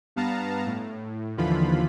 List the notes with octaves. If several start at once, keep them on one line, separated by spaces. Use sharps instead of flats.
G2 B3 F5 A5 A#5
A2
D#2 D3 E3 F3 F4 B5